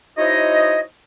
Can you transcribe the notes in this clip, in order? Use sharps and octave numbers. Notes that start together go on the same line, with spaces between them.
D#4 E4 F#4 C5 C#5 D#5